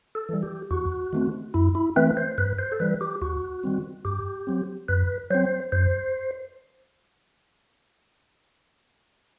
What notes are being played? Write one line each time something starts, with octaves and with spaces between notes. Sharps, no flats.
A4
E3 G3
G4
E2 F#4
D#3 A3 C4
F#2 E4
E4
E3 A3 C4 B4
C5
G2 B4
C5
A4
E3 G3 B4
G4
D#2 F#4
D#3 G3 C4
G2 G4
F#3 C4
F#2 B4
F#3 C4 C5
F#2 C5